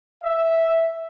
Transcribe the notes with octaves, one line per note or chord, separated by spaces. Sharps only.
E5